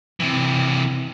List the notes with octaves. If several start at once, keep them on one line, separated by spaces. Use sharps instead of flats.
C3 E3